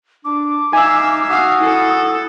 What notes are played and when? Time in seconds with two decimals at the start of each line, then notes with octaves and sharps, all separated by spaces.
0.25 D4 D6
0.73 D#4 E5 F5 G#5 E6
1.29 F#4 F5 D#6
1.61 E4 A4